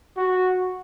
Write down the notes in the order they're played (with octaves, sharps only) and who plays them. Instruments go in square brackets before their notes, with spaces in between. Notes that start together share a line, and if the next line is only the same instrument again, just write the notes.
[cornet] F#4